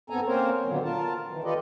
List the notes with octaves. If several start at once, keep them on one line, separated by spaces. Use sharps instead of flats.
G#2 B3 C4 A4 G#5 A#5
A#3 C4 C#4 A#4 C5 C#5
A#2 D3 D#3 F#3 A#3 B3
F4 A#4 A5
D#3 E3
F4 G4 A4 B4 D5 D#5